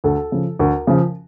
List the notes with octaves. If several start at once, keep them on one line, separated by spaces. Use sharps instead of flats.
D2 A4
C#3 F3
D2 A#4
C#3 F3